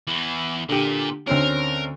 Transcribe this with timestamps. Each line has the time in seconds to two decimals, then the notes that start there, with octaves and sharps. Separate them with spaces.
0.07 E2 E3
0.69 A#2 D3 G4
1.27 D2 C4 C#4 A#4